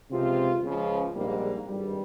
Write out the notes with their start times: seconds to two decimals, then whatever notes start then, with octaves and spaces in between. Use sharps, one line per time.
0.10 C#2 C3 F3 C4 F4
0.62 C#2 C#3 F3
1.14 A#1 G#2 G3 A#3
1.66 G#1 G2 G3